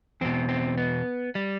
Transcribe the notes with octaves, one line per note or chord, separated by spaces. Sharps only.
E2 B2 C4
C4
B3
G3